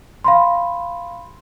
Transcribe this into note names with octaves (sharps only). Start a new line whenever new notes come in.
F5 B5 C6